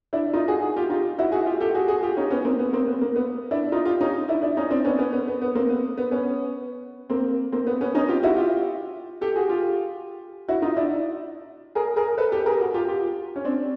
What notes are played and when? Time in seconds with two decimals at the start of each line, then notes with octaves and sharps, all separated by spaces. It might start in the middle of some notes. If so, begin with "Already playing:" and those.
0.13 D4 E4
0.33 D#4 F4
0.48 F#4 G#4
0.62 F#4 G#4
0.76 F4 G4
0.90 D#4 F4
1.18 E4 F#4
1.32 F#4 G#4
1.46 F4 G4
1.61 G4 A4
1.75 F#4 G#4
1.88 F#4 G#4
2.02 F4 G4
2.17 C#4 D#4
2.31 B3 C#4
2.45 A#3 C4
2.59 B3
2.73 A#3 C4
2.87 B3
3.01 A#3
3.16 B3
3.51 D4 E4
3.72 D#4 F4
3.85 F4 G4
4.01 C#4 D#4
4.28 D4 E4
4.42 D4 E4
4.57 C#4 D#4
4.71 C4 D4
4.85 B3 C#4
4.99 B3 C#4
5.13 B3
5.27 B3
5.42 B3
5.55 A#3 C4
5.69 B3
5.97 B3
6.11 B3 C#4
7.10 A#3 C4
7.52 A#3 C4
7.67 B3
7.81 B3 C#4
7.95 C#4 D#4
8.08 F4 G4
8.23 E4 F#4
8.36 F4 G4
9.21 G4 A4
9.36 F#4 G#4
9.49 F4 G4
10.48 E4 F#4
10.62 D#4 F4
10.77 D4 E4
11.75 G#4 A#4
11.96 G#4 A#4
12.18 A4 B4
12.32 G4 A4
12.46 G#4 A#4
12.59 F#4 G#4
12.74 F4 G4
12.88 F4 G4
13.36 C#4
13.45 C4 D4